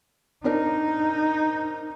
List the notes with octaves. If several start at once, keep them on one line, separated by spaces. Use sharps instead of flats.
C4 D4 D#4 A#4